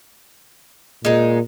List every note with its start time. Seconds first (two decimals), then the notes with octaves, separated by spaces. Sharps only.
1.05 A#2 G#3 D#4